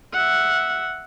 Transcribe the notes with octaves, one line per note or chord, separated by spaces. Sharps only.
E5 F#5